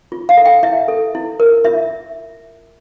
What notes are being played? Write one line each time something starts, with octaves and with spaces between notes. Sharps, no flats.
F4
F5
A4
G5
E4 E5
A4
E4
A#4
F4 E5